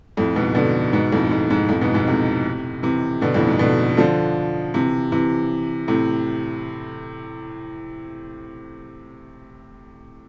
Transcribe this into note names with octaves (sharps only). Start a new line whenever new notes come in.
F2 A2
G#2 B2
B2 D3
G#2 B2
F2 A2
G#2
G#2
F2 A2
G#2 B2
G#2 B2
A2 C3
C3 E3
B2 D3
F2 A2
G#2
B2 D3
D3 F3
C3 E3
C3 E3
A2 C3